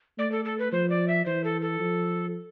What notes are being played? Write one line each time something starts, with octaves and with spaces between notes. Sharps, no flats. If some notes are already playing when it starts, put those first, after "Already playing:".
A3 D5
A4
A4
B4
F3 C5
D5
E5
E3 C5
A4
A4
F3